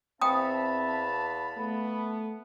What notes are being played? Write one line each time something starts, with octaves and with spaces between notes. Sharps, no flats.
E2 C4 E5 F5 G5 A5 B5 D#6
A3 B3